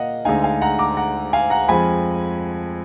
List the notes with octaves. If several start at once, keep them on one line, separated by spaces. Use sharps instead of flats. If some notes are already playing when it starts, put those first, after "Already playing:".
Already playing: A#2 A#3 A#4 D#5 F5 F#5
D2 D3 G#3 D#4 F5 G#5
F5 G#5
F#5 A#5
A#5 D6
F#5 A#5
F5 G#5
F#5 A#5
F2 F3 G#3 G#5 B5